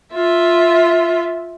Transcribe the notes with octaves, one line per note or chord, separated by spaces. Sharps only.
F4 E5